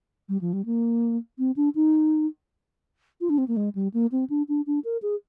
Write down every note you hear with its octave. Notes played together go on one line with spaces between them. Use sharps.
G3
F3
G3
A#3
C4
D4
D#4
F4
D4
C4
A#3
G#3
G3
A#3
C4
D4
D4
D4
A#4
G#4